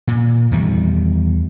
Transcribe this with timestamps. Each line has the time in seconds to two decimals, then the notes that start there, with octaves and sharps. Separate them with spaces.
0.07 A#2
0.51 E2 D#3 G3